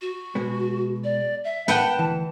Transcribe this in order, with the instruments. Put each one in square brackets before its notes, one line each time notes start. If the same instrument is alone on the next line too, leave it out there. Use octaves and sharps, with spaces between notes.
[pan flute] F#4
[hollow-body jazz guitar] B2 G#3 B3
[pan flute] D5
E5
[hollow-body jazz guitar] B3 [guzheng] B4 F#5 G5 [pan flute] A5
[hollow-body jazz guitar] D2 E3